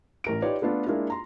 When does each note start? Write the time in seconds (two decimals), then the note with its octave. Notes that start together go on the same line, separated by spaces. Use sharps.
0.24 A1 A#4 D7
0.42 D#4 F4 G4 B4 C#5 D5
0.62 A3 B3 D4 F4 A4
0.86 G#3 A#3 D4 E4 F4
1.10 A#5 C6